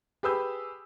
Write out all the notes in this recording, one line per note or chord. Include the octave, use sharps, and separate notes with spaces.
G4 G#4 B4 D#6 E6 G6